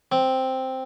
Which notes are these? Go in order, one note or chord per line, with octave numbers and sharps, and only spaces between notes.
C4